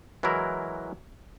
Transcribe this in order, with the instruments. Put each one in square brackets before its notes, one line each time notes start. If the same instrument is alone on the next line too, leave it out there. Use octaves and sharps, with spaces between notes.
[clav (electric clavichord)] E3 F#3 G#3 E4 A#4